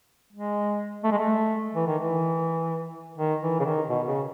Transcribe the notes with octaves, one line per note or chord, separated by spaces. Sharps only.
G#3
A3
G#3
A3
E3
D#3
E3
D#3
E3
C#3
D#3
B2
C#3